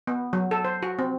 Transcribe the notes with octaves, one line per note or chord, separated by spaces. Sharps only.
B3
F#3
A4
C5
F#4
C4